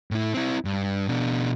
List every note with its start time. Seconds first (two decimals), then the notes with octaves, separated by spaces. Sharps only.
0.11 A2 E4
0.34 C4 E4
0.65 G2
1.08 B2 D4